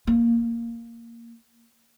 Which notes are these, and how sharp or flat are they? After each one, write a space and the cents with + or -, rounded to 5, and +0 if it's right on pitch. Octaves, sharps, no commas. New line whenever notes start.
A#3 -5